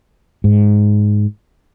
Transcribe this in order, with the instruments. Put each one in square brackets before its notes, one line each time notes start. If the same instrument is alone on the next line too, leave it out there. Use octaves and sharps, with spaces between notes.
[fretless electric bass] G#2